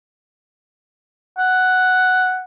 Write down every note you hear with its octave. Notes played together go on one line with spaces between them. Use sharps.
F#5